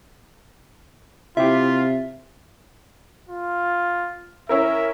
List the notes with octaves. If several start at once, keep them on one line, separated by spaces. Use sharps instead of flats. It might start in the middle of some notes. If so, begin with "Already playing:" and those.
C3 E4 F4 G4 E5
F4
C#4 E4 A#4 E5